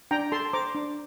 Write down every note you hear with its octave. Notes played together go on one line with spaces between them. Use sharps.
D4 G5 A#5
A4 A5 C6
C5 A#5 D6
D4